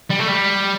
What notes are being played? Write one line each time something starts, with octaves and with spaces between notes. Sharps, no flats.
G3
A3
G3